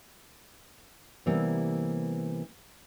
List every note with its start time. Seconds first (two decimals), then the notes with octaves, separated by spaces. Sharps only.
1.26 C3 E3 G3 A#3 B3